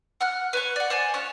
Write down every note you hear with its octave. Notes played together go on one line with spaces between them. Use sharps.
F#5 F6 F#6
B4 C#5 C#6
D5 F#5
C5 D5 G#5
C#4 F4 C#5 F#6